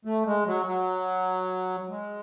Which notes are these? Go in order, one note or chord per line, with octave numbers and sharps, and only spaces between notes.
A3
G#3
F#3
F#3
G#3